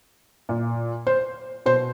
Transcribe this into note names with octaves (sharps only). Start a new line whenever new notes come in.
A#2
C5
B2 C5